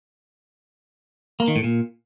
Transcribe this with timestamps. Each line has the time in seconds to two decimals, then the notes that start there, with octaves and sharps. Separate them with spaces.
1.40 A#3
1.48 D#3
1.56 A2
1.64 A#2